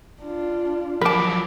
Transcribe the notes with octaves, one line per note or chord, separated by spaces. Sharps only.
D4 F4
F3 F#3 A#4 A5 B5 D6